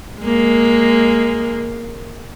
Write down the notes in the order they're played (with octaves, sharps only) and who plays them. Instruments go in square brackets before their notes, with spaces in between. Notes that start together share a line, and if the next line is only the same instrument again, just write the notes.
[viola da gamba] G#3 A#3